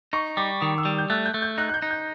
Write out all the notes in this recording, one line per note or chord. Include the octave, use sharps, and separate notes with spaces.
D#4 C#6
G3 D6
D#3 D#6
E6
G3
G6
A3 F#6
G6
A3
G6
D#4 F#6
F#6
G6
D#4
G6